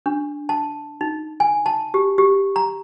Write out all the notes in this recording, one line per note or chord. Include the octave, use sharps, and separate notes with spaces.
D4
A5
D#4
G#5
A5
G4
G4
A#5